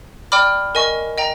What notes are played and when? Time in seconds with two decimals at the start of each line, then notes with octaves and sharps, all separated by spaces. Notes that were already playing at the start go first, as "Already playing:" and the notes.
0.32 D5 G5 B5 D6 F6
0.75 A#4 D#5 G#5 C#6
1.18 D#5 G5 A#5